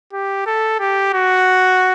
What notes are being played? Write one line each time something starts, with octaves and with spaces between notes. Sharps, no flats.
G4
A4
G4
F#4